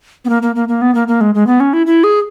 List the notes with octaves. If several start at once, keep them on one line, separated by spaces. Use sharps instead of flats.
B3
A#3
A#3
A#3
A#3
B3
A#3
A#3
G#3
G#3
B3
C#4
E4
E4
G#4